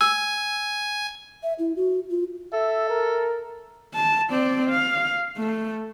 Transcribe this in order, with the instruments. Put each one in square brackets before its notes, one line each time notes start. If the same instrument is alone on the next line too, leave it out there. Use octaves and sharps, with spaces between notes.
[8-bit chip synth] G#5 [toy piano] E6
[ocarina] E5
E4
F#4
F4
[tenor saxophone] A4 [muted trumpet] E5
[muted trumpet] A#4
[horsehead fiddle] A5
C4 D5
F5
A3